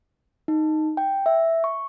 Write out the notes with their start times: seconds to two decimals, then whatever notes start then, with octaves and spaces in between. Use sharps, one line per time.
0.48 D#4
0.97 G5
1.26 E5
1.64 C#6